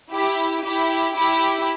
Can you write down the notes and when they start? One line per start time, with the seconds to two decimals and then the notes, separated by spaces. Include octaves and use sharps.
0.12 E4 G4
0.64 E4 G4
1.16 E4 G4